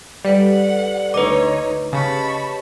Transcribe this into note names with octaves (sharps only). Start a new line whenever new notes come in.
G3 A4 B4 D5 F#5
D2 D#4 B4 C#5 D#5 D6
C#3 G4 C#5 D#5 A5 B5 C#6